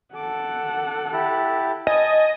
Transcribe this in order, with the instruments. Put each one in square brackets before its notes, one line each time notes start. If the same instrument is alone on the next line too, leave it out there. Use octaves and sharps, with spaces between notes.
[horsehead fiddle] A4 F#5 [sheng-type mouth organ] D6
[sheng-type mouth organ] E4 G4 A5
[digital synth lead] D#5 [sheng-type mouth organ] G#5 A5